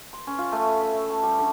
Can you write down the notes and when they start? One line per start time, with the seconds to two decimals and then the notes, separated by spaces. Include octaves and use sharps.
0.13 C6
0.27 C#4
0.38 F4
0.52 A3
0.68 B5
0.81 E5
0.93 E5
1.10 A5
1.23 G3
1.39 D3